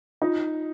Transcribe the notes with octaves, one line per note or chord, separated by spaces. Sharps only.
D#4 F4